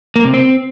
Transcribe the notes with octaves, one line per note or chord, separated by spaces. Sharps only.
A#3
C3
C4